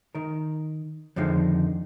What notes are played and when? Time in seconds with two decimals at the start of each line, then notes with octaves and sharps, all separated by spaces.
0.15 D#3 A#4
1.16 F2 D3 D#3 F3 G#3